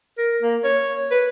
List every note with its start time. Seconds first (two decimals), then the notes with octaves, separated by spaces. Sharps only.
0.18 A#4
0.42 A#3
0.64 C#5
1.12 B4